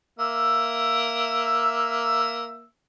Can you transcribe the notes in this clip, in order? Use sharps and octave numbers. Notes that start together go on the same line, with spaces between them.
A#3 E5 E6